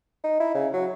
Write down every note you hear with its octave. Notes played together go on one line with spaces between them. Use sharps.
D#4
E4
C#3
F#3